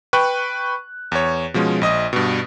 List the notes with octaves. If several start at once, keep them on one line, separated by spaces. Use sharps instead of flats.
B4 G5 C#6 F#6
E2 C#5
B2 F3 G#3 C#4
A#1 D#5 D#6
G2 B2